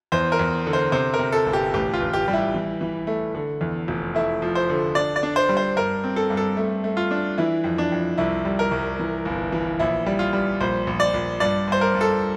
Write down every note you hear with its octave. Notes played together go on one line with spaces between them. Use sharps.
E2 C5
A#4
E2
D3
C5
C3 C5
A#4
C3
A4
G1
G4
A1 G4
F4
A1
G4
G3
E4
E3
E3
A3
D3
E2
F1
A3 E4
F3
C5
D3
D4 D5
D5
D4
C5
G3
C5
G2 A#4
C4
A4
G2
A4
A3
A3
F4
D4
E3 E4
F2
D4
F2
C2 E4
G3
A#4
C2
E3
G1
E3
A#1 E4
G3
F4
G3
A#1 C5
A#1
D5
A#1
G2 D5
G2 C5
A#4
G2
A4